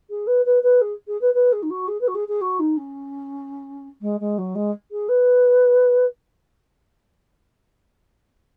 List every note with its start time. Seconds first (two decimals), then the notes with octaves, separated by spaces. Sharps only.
0.10 G#4
0.27 B4
0.45 B4
0.63 B4
0.81 G#4
1.07 G#4
1.21 B4
1.34 B4
1.52 G#4
1.62 D#4
1.70 F#4
1.88 G#4
2.00 B4
2.07 F#4
2.14 G#4
2.28 G#4
2.41 F#4
2.59 D#4
2.77 C#4
4.01 G#3
4.20 G#3
4.38 F#3
4.55 G#3
4.91 G#4
5.08 B4